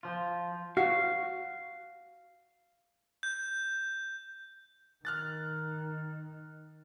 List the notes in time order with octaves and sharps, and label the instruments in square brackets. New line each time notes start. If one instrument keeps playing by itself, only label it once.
[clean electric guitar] F3 F4
[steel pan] F#4 [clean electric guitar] F5
[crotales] G6
[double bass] D#3 [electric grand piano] F6 F#6 A6